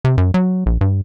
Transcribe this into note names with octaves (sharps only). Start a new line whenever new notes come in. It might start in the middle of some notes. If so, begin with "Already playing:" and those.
C3
F#2
F#3
A#1
G2